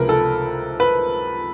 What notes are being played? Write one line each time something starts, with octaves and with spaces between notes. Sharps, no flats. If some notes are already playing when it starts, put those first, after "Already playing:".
Already playing: C#2 C3 F3 A#4 B4
A4
B4